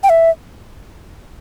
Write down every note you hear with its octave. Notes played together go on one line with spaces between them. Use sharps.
G5
E5